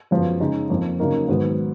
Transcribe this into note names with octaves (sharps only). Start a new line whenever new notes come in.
F#2 F3 G#3 B3
C#3 G#3 D#4
F2 F3 A#3
C#3 F#3 A#3 D#4 A#4
G#2 D#3 F#3 B3